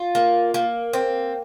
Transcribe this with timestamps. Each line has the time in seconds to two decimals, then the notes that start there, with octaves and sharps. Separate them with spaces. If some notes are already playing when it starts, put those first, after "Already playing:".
Already playing: F4
0.15 A#3
0.54 A#3
0.93 C4